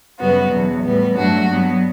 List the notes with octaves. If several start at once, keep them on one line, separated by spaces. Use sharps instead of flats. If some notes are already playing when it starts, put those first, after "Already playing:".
F#2 C#3 G3 B3 F#4
E2 B2 F#3
A2 G3 B3
G2 F#3 A3 D4 F#4
G2 F#3 B3